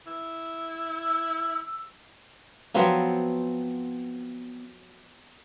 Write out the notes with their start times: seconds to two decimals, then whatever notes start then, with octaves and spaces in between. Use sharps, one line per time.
0.07 E4
0.89 E6
2.74 F3 F#3 B3 C4